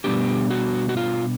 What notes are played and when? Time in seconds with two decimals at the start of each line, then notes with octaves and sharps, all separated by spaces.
0.04 B2 G3 B3 D4 G4
0.50 F#4
0.89 F#4
0.97 F4